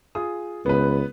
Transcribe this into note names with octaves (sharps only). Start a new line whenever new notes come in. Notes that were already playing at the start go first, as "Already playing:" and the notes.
F4 G#4 D#6
C#2 B3 B4